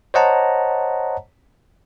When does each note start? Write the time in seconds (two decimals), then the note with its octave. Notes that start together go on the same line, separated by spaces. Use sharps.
0.14 C5 C#5 D#5 F#5 A5 A#5